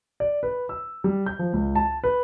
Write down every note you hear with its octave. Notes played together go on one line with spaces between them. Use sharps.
D5
B4
E6
G3
G6
F3
C#2
A5
B4